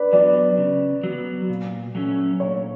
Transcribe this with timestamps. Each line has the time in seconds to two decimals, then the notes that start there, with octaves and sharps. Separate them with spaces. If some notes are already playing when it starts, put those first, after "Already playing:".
Already playing: B4 D5
0.12 F#3 B3 D5
0.57 C#3
1.03 F#3 B3
1.49 A#2
1.95 F#3 A3 C#4
2.40 A#2 C#5